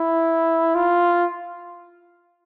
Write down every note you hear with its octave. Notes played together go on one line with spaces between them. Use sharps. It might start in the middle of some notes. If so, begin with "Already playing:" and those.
Already playing: E4
F4